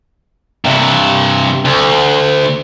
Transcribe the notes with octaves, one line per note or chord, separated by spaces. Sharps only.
G2 C3
D2